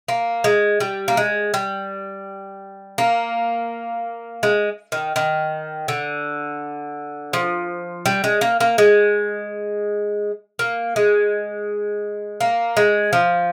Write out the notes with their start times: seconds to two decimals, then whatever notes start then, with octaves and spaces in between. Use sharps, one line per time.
0.08 A#3
0.44 G#3
0.80 G3
1.08 A#3
1.17 G#3
1.54 G3
2.98 A#3
4.43 G#3
4.92 D#3
5.16 D#3
5.88 D3
7.33 F3
8.06 G3
8.24 G#3
8.41 A#3
8.60 A#3
8.78 G#3
10.59 A#3
10.96 G#3
12.41 A#3
12.77 G#3
13.13 F3